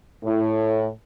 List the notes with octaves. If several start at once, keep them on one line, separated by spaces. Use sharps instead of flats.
A2